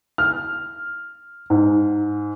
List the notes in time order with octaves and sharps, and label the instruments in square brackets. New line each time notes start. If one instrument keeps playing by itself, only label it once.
[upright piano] F6
G#2